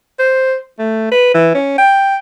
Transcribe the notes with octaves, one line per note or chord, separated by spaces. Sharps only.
C5
A3
B4
E3
C#4
G5